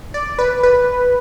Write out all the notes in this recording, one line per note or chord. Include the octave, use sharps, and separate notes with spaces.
D5
B4
B4